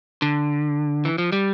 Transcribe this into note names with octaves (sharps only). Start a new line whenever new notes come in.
D3
E3
F3
G3